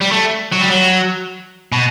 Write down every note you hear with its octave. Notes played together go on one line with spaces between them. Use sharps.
G3
A3
F#3
G3
F#3
B2